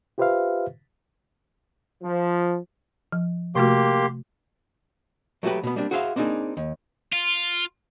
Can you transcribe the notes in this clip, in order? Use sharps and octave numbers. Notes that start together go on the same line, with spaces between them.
F4 G4 B4 C5 E5 F5
F3
F3
C3 A3 A#3 F#4 G4 C6
F#3 A3 B3 F#4 G4 B4
B2 B3
G3 A#3 C4 D4
F#4 G#4 C5 E5 F5
A#3 C4 D4 D#4 G#4
D#2
F4